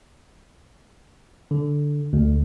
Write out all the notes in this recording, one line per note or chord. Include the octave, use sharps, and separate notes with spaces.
D3
D2